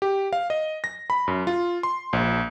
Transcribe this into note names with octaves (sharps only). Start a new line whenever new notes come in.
G4
F5
D#5
A#6
B5
F#2
F4
C6
A#1